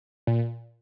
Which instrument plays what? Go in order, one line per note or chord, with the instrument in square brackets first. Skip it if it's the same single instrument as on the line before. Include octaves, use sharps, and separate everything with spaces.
[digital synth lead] A#2